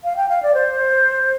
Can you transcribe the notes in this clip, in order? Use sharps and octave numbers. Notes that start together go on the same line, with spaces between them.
F5
G5
F5
D5
C5